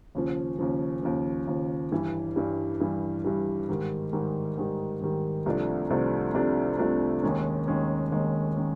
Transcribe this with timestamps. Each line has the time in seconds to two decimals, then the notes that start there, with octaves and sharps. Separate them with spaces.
0.15 D#2 C#3 F3
0.59 D#2 C#3 F3
1.03 D#2 C#3 F3
1.47 D#2 C#3 F3
1.92 G2 E3 G3
2.36 G2 E3 G3
2.80 G2 E3 G3
3.25 G2 E3 G3
3.69 G#2 D#3 G3
4.13 G#2 D#3 G3
4.58 G#2 D#3 G3
5.01 G#2 D#3 G3
5.46 C2 C3 F3 A3 D4
5.90 C2 C3 F3 A3 D4
6.34 C2 C3 F3 A3 D4
6.79 C2 C3 F3 A3 D4
7.23 D#2 D#3 G#3 C#4
7.67 D#2 D#3 G#3 C#4
8.11 D#2 D#3 G#3 C#4
8.56 D#3 G#3 C#4